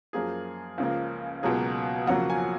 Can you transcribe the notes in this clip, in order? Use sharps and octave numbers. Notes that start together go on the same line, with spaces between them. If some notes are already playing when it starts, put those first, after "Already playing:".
F#2 F3 A#3 G#4
C#2 C#3 F3 A#3
C#2 B2 F#3 A#3 G#4
F2 C#3 F#3 A#3 F#5
G#5